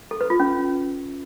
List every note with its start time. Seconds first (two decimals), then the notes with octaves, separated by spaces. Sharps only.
0.11 A4
0.21 B4
0.30 F4
0.40 C#4